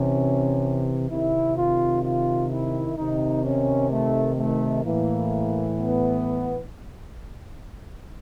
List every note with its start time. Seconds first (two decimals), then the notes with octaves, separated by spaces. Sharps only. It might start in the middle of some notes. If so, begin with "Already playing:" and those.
Already playing: C3 E3 C#4
1.10 C3 D#3 E4
1.57 F4
2.04 F4
2.51 E4
2.97 C3 D#3 D#4
3.44 C#4
3.90 A3
4.37 A3
4.84 A2 E3 A#3
5.77 B3